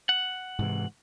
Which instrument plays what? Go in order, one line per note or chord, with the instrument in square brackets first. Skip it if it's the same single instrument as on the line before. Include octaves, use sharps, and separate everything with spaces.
[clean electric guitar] F#5
[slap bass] G#2 C3 E3